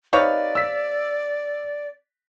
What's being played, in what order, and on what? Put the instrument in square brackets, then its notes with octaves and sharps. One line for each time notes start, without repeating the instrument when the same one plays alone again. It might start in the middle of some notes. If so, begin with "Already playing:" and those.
[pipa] C3 C#5 F5 [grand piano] D#4 B4 [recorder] D5
[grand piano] E6 B6